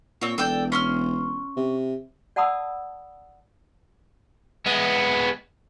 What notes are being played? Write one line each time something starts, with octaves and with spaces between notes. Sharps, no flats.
A#2 C4 C#5
E1 A4 D5 G5
C#4 C6 F6
C3
D5 F#5 A5 B5 D#6 E6
G#3 B3